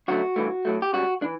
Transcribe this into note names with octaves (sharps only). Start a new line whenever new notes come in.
F#2 D3 F#3 A3 F#4
G2 E3 A3
A2 F#3 A3
G4
C#2 C#3 G3 F#4
E3 D4